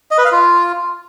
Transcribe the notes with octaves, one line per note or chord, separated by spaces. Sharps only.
D#5
B4
F5
F4